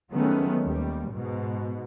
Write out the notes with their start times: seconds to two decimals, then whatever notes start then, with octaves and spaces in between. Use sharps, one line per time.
0.12 D#3 F#3 G#3 A3 B3 C#4
0.63 D#2 G3
1.11 G#2 B2